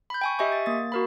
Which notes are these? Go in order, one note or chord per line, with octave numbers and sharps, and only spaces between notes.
B5 G6
G5 G#5 C#6
G4 D#5 E5 G#5 C#6
A6
A#3 A6
F#4 A#4 B5